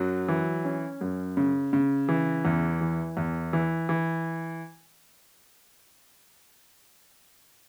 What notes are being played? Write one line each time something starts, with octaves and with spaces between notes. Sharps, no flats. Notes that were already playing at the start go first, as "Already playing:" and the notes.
Already playing: F#2 F#3
E3
C#4
F#2
C#3
C#3
E3
E2
E3
E2
E3
E3